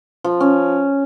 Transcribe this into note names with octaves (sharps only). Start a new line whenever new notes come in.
F3
C#4